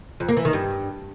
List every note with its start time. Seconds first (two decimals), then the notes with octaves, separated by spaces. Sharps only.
0.20 F2
0.28 A#3
0.37 E3
0.45 D#3
0.53 G2